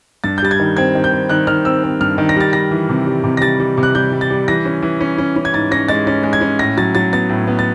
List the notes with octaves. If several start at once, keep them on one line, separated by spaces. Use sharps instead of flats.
G2 A6
G6
G3 A6
G#6
D#3
C4 G#6
D#3
G6
C4
D#3 F#6
D#3 F6
C4 E6
C4
G2 F6
D#3
A#6
G3 A6
G3 A#6
E3
C3
G3
C3
A#6
G3 A6
G3
C3
F#6
G3 G6
G3
A6
G3
E3 A#6
C#4
E3
C#4
C#4
C#4
G#6
G#2 A6
C#4 A#6
G#3 A6
C#4 A6
G#3
G#6
C#4
A2 A#6
F#3 A6
F#3 A6
B3 A6
A2
B3
A6